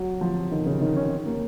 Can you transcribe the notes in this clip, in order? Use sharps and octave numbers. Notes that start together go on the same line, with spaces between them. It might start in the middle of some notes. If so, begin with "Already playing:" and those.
Already playing: F#3
F3
D#3
C#3
D#3
C#4
A#3